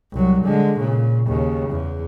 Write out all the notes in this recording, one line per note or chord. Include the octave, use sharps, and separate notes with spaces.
C2 F#3
D3 G#3
A#2 C#3
D#2 C#3
E2